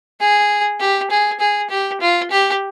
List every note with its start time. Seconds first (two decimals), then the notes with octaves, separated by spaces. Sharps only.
0.20 G#4
0.80 G4
1.10 G#4
1.40 G#4
1.70 G4
2.01 F4
2.31 G4